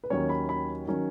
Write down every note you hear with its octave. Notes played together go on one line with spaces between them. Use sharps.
B4
D#2 D#3 F#3 C#4 C#5
B5
B5
D#3 F#3 C#4